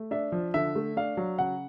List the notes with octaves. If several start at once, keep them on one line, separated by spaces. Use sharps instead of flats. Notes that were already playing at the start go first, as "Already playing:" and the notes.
Already playing: A3
D4 E5
F3
D3 E5
A3
D4 F5
F#3
C#3 F#5